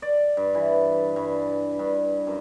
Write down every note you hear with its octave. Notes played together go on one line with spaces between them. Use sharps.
D5
G2
E3
G2
G2
F#2